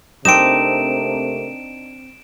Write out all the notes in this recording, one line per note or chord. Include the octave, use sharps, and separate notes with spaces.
C3 A3 A#3 C4 D4 D#4 D7 E7